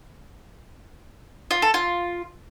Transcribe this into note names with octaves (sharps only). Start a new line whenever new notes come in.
F4
A4
F4